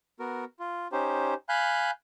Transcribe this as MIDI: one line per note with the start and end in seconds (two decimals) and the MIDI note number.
0.20 0.45 59
0.20 0.45 66
0.20 0.45 70
0.60 0.88 65
0.92 1.34 61
0.92 1.34 63
0.92 1.34 67
0.92 1.34 72
1.49 1.91 77
1.49 1.91 80
1.49 1.91 83
1.49 1.91 90
1.49 1.91 91